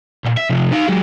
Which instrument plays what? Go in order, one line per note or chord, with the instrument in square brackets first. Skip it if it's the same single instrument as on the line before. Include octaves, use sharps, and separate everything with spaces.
[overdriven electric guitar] B1 A#2
E5
C3 F3
D#4 F5
F#3 G#3